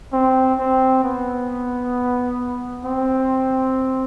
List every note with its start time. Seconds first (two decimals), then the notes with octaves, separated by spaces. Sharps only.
0.13 C4
0.59 C4
1.04 B3
2.85 C4